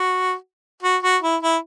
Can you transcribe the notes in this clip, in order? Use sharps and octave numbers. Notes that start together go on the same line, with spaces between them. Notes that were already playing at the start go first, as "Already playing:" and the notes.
Already playing: F#4
F#4
F#4
E4
E4